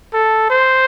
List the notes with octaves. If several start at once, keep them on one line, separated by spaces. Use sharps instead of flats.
A4
C5